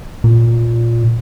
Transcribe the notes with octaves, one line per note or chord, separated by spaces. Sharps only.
A#2